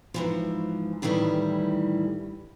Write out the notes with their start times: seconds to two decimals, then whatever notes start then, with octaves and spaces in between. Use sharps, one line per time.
0.14 G#2 E3 F3
1.02 A2 D#3 E3 G3 E4